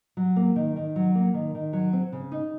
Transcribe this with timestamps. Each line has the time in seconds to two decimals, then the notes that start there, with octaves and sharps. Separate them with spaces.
0.17 F#3
0.36 A#3
0.56 D#3
0.76 D#3
0.96 F#3
1.15 A#3
1.34 D#3
1.55 D#3
1.73 F#3
1.93 C4
2.12 C#3
2.32 D#4